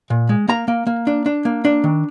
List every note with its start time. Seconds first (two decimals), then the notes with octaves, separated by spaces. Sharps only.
0.10 A#2
0.29 G#3
0.48 A#3 A#5
0.68 A#3
0.87 A#3
1.07 D4
1.26 D4
1.45 A#3
1.65 D4
1.84 D#3